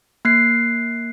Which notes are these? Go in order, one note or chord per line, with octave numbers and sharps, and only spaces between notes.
A#3 F#6 C7